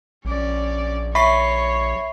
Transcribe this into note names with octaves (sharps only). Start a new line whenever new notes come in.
A#1 C#4 D5
C#5 E5 B5 C#6 C7